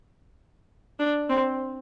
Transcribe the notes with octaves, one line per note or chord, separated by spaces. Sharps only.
D4
C4